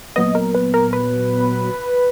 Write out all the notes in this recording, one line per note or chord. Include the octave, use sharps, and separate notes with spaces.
A#2 F#3 B3 D#5
A#4
B4
A#4
B4